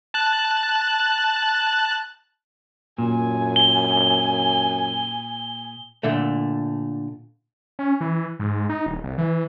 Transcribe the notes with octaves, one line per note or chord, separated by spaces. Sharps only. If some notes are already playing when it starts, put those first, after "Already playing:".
A5 F#6
F#2 A#2 G#5
G7
A#2 D3 A3
C#4
E3
G#2
D#4
D1
C2
E3